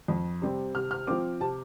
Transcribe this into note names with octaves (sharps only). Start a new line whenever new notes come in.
F2
C3 G3 C4
C3 F6
F6
F3 C4 D6
C3 A5